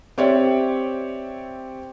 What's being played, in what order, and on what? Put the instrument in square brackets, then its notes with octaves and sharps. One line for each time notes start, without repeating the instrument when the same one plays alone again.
[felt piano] C4 G4 C#5 D5 E5